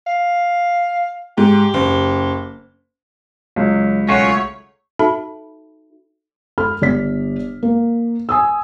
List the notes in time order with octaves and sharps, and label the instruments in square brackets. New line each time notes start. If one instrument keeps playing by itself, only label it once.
[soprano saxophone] F5
[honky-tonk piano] G#2 [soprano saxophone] G4
[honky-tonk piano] F#1
[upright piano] C#2 [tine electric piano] F#3
[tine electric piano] B1 A3 F#5 [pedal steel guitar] C#4 F4 F#4 [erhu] C#5
[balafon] D#4 F#4 A4 E5 A5 B5
[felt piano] A4 B5 F6
G1 D5 B6
A#3
G#5 D#6 E6